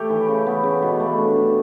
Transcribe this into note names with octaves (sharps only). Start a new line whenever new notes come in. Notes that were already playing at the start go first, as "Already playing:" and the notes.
Already playing: A3 G4 C#5 E5
E3
C#3
B3
C#3
B2
A3
D4
D4